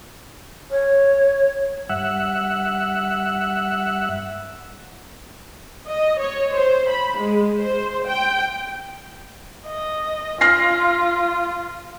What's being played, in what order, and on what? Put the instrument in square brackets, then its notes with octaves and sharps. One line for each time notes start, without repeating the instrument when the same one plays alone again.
[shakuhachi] C#5
[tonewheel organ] G2 E5 F#5
[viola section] D#5
C#5
C5
B5
G#3
C5
G5
[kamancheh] D#5
[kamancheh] F4 [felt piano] F6 A#6 C7